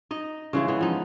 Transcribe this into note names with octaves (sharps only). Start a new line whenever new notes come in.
D#4 D#5
C#3 E3 G#3
E3 B3
F3 D#4